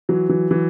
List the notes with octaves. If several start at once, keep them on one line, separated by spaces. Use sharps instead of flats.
E3 F#3
E3 F#3
E3 F#3